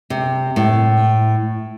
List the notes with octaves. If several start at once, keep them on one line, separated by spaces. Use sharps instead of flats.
C3
A2